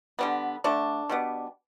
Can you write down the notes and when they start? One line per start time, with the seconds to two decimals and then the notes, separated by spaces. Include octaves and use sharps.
0.19 D3 G3 B3
0.64 D3 A3 D4
1.10 B2 G3 B3